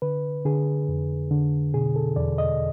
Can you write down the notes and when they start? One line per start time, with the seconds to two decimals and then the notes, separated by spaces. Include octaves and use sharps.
0.02 D3 B4
0.45 D3 G#4
0.88 F2
1.31 D3
1.74 B2 G#4
1.96 A4
2.16 E2 D5
2.38 D#5